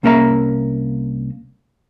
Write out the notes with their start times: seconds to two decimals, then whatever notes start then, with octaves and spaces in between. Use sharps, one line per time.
0.03 C2 A#3 C#4 A#4 E5 A#5